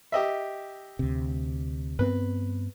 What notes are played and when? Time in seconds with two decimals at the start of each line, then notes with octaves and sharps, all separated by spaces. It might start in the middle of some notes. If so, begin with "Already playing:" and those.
0.12 G4 D#5 E5
0.99 D2 C3
1.99 G2 B3 C4 B4